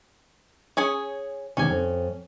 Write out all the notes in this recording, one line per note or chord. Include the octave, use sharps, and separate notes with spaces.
C#4 G#4 C#5
E2 C3 D#3 C#4 G#5
F2